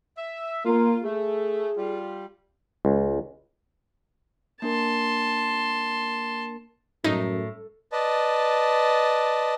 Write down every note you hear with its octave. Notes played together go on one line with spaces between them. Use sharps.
E5
A#3 F4
A3 G#4
G3 F4
C#2
A#3 D4 A#4 A5 C6
F#2 A2 D#4
B4 D5 D#5 A5